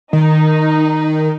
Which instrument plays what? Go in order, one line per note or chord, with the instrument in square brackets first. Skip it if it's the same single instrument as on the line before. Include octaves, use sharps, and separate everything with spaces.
[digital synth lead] D#3 [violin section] D#4